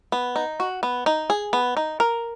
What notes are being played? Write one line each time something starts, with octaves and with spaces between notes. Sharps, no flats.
B3
D#4
F#4
B3
D#4
G#4
B3
D#4
A#4